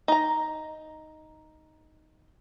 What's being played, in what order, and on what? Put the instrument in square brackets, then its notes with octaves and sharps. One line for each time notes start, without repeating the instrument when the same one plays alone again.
[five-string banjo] D#4 A#5